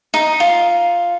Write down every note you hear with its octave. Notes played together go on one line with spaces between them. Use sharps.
D#4
F4